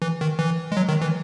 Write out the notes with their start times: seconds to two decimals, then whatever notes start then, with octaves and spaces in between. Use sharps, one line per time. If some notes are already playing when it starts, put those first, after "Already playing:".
0.02 E3
0.21 D#3
0.39 E3
0.72 G#3
0.77 F#3
0.89 D#3
1.01 E3